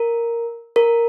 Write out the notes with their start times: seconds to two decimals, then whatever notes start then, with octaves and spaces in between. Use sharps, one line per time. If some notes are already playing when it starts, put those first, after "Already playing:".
Already playing: A#4
0.76 A#4